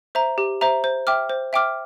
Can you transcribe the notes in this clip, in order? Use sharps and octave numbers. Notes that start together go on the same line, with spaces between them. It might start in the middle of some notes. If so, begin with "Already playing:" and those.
C5 E5 A#5
G4
C5 E5 A#5
C5
E5 G5 D6 F6
C5
E5 G5 D6 F6